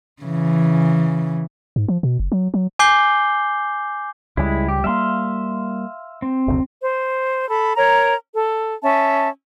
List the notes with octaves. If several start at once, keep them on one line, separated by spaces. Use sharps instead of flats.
C#3 E3
G#2
F3
B2
F#1
F#3
F#3
G#5 D6 G6 C7 G7
C#2 C#3 G3 G#3 E4
G4
G3 G#3 A#3 E5 F5 C6
C4
F#1 D2 C3
C5
A4 B5
A#4 C#5 A#5
A4
C#4 E5 A5